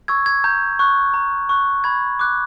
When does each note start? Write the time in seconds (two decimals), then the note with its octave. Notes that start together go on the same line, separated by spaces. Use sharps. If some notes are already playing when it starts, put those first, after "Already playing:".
0.08 C#6 E6 G#6
0.26 G#6
0.44 A#5 G6
0.79 C#6 F#6
1.14 A#5
1.49 C#6 F#6
1.84 B5 G#6
2.19 D6 F#6